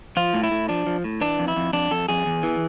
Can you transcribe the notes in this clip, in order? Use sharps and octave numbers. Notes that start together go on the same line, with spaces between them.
F3 F4
A2
E4
A2
F3 D4
F3
A2
E3 D4
F2
E4
F2
F2 D4
F2 A4
F2 G#4
E2
E3